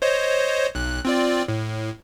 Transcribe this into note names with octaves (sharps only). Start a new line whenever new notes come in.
C5 C#5 D#5
B1 F#6
C4 F4 D5
A2